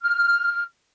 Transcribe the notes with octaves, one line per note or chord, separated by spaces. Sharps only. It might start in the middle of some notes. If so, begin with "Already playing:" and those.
F6